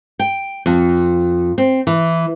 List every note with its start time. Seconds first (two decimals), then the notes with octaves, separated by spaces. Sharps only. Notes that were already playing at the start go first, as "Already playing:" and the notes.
0.19 G5
0.66 F2
1.58 C4
1.87 E3